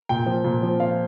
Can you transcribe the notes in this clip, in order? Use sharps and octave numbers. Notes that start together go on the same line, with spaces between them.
A#2 G5
F3
A#2
F3
F3 F5